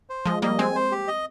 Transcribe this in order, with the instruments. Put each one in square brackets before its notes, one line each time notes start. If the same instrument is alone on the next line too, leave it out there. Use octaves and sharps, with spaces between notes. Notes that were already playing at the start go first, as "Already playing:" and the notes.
[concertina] C5
[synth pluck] F3 G#3 [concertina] D#5
[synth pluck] G3 A#3 [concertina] D#5
[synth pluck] G#3 C4 [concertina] G#5
[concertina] C5
G4
D#5